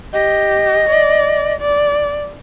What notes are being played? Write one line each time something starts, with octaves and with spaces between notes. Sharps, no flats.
G4 D#5
D5
D5